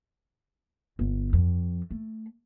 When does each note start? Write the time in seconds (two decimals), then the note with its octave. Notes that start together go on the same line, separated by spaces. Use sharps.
0.99 G1
1.33 F2
1.91 A3